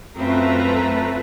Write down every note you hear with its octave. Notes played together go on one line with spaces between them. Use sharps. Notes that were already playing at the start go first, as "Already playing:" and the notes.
F#2 A3 C4 F4 B4 E5 A#5